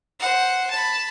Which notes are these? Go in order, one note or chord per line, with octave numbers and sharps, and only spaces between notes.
C5 F#5
A5 B5